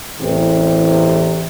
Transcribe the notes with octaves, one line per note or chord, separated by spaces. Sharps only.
A1 E2 C3